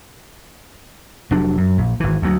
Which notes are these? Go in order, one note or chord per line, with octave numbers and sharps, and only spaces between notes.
F1 F#3 D4
F#2
A#1
G#1 E3
D2 F#3